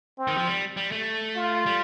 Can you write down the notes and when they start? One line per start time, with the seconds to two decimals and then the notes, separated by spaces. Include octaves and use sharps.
0.18 C4
0.27 D#3
0.37 F3
0.47 G3
0.77 G3
0.92 A3
1.36 F4
1.66 G3